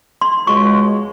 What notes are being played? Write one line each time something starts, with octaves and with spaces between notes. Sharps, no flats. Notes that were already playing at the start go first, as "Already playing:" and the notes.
C6
C#2 B2 G#3 C#6